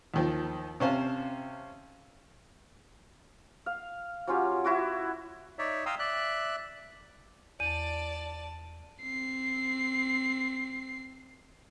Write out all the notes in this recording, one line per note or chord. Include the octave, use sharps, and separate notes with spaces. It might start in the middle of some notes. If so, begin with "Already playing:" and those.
D#2 D#3 F3
C3 C#4 C5 F5 A5
F5
F#3 C#4 F4 G4
E4 F#4 D6
D#4 C#5 D5 E5
F5 G5 A#5 C6 D#6 E6
D5 E5 F#6
E2 D5 A5 D#7
C4 C7